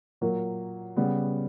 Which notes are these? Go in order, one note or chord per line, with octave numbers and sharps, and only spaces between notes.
A#2 F#3 A#3
C#3 G3 B3